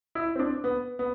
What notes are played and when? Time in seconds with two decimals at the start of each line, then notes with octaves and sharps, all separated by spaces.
0.15 E4
0.36 C4
0.39 D4
0.64 B3
0.99 B3